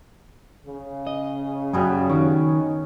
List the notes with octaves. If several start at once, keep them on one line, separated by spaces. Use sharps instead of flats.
C#3
D#5
F#2 B2 G3 G#4
D#3 C#4
D#4